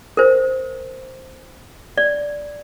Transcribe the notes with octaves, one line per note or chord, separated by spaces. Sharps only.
A#4 C5
D5